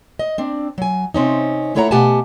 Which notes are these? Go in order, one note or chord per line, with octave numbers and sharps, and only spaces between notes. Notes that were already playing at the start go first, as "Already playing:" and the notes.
D#5
C4 D4
F#3 G#5
C3 C4 C#4 D#4
A3 E4 A4 C#5 F#5 A#5
B2 A3 G4 F#5 G#5 A5